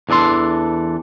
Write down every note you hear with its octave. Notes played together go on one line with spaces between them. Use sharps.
E2 E3 D4 A4 C6